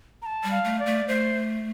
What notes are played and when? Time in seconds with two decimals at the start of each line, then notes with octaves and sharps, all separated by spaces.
0.22 A#5
0.26 A5
0.44 G3
0.51 F5
0.65 A3
0.79 D5
0.86 A3
1.08 A3 C5